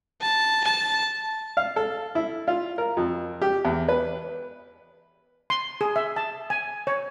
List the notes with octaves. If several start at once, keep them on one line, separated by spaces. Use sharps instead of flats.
A5
A5
F5
A4
E4
F4
A#4
F2
G4
E2
B4
C6
G#4
E5
A5
G#5
C#5